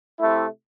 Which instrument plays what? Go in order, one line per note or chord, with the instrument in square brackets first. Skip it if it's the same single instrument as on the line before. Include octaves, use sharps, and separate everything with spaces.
[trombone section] C3 A3 E4